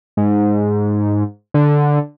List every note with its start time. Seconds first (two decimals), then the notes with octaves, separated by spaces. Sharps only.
0.17 G#2
1.54 D3